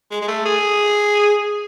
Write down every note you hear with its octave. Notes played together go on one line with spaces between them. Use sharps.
G#3
G#3
A3
G#4